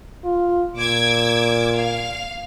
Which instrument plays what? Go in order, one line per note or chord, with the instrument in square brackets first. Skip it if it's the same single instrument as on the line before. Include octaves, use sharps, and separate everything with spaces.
[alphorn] F4
[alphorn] A#2 [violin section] D6 E6 G#6
[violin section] F5